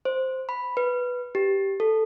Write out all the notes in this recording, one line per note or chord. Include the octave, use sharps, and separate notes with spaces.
C5
B5
B4
G4
A4